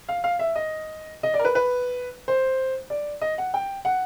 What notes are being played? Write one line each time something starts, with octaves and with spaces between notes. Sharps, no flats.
F5
F5
E5
D#5
D#5
D5
A#4
B4
B4
C5
D5
D#5
F#5
G5
F#5